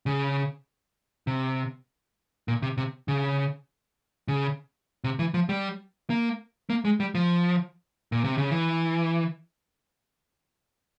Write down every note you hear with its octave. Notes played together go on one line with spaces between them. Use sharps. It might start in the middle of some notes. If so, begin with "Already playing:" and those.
C#3
C3
A#2
C3
C3
C#3
C#3
C3
E3
F3
G3
A#3
A#3
G#3
G3
F3
A#2
C3
C#3
E3